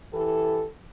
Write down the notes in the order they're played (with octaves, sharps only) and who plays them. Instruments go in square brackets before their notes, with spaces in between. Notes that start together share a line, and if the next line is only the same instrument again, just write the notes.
[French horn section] E3 E4 G4 A4